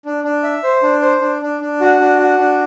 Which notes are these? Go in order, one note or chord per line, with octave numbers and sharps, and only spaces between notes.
D4
D4
E5
C5
D4
C5
D4
D4
D4
F#4
D4
F#4
D4